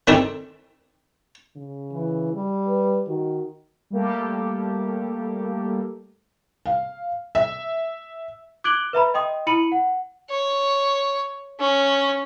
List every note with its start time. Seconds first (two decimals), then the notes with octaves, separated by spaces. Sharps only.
0.07 D#3 C4 D4 D#4 G#4 A4
1.57 C#3
1.92 E3
2.33 G3
2.67 B4
3.08 D#3 F#4
3.90 G3 A3 A#3 G4 A4
6.66 F5
7.35 E5
8.64 D6 F#6 G#6 D7 F#7 G7
8.93 B4 E5 A#5 B5
9.14 D#5 G5 C6 D#6
9.47 E4 B5 C#7 D#7 F#7
9.72 F#5
10.30 C#5
11.60 C#4